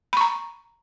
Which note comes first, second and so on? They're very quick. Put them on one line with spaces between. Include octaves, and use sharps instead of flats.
B5 C#6 A#5